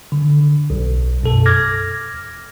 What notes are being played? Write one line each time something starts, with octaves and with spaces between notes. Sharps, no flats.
D3
B1
F#2 B2 A4
D6 F6 G#6 A#6